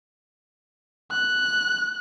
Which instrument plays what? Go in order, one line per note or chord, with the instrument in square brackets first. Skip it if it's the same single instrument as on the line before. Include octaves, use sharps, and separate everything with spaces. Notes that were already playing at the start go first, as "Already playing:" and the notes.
[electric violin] F#6